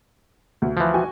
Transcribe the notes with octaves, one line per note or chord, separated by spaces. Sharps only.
D2
E3 F3
F#4 G5 G#5